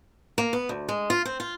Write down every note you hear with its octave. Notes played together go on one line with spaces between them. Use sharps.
A#3
B3
D2
G#3
F4
C4
F4